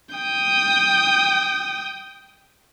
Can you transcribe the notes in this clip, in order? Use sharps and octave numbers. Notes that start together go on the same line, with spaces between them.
G5 D#6